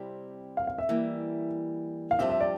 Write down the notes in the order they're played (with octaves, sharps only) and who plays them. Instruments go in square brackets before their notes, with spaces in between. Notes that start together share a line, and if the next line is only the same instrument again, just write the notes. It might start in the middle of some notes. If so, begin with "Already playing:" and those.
Already playing: [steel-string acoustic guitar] C3 G3 C4 E4 G4
[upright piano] F5
F5
E5
[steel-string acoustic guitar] E3 G3 A#3
[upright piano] F5
[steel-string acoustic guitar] G2 F3 C4 G4 [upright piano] E5
[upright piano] E5
D5